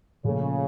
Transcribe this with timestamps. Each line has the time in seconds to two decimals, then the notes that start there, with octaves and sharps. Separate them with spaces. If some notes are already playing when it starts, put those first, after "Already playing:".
0.24 A#2 C#3 F3 A3